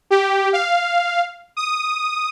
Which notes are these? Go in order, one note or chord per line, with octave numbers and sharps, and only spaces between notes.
G4
F5
D#6